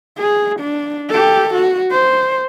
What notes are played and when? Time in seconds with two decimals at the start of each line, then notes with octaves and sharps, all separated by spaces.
0.18 G#4
0.60 D4
1.10 G4 A4
1.54 F#4
1.91 C5